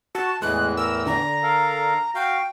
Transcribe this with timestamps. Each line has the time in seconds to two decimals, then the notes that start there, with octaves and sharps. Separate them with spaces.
0.15 F#4 A5
0.42 E2 A2 E3 G#3 F#6
0.77 A#4 E6
1.06 D3 A#5
1.43 A4 A#4 F5
2.15 F#4 F5 G5